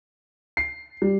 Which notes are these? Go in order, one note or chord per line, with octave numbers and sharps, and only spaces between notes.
C7
G3